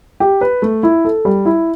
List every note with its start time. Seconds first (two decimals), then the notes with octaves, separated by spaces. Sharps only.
0.20 G4
0.41 B4
0.62 A3
0.83 E4
1.05 A4
1.25 G3
1.45 E4